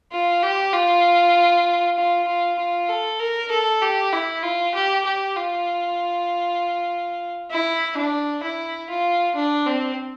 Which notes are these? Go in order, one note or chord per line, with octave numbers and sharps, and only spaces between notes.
F4
G4
F4
F4
F4
F4
A4
A#4
A4
G4
E4
F4
G4
G4
F4
E4
D4
E4
F4
D4
C4